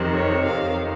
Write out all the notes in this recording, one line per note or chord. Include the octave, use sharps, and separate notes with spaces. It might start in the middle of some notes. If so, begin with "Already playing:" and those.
Already playing: F2 C3 D#3
C#5
F2 C3 D#3 F5